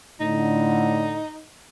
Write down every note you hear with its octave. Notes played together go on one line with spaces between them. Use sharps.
A2 D3 D#4